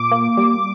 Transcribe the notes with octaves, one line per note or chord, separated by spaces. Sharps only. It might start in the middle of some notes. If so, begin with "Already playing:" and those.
Already playing: A#2 D6
A#3
G3